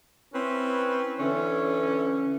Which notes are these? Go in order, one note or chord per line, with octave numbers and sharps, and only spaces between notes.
C4 C#4 E4 B4
D3 E3 C#4